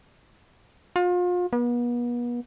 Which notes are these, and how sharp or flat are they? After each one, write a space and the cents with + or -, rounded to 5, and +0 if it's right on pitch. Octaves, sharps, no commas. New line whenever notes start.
F4 +35
B3 -40